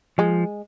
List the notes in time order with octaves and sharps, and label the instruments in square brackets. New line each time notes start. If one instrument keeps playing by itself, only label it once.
[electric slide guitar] F3 [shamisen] G#3